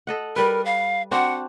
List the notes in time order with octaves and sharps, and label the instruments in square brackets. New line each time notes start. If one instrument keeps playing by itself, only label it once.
[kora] A4 D#5 F#5
[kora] G3 B4 [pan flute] A#4
[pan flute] F5
[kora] C4 D4 F#4 [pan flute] F#5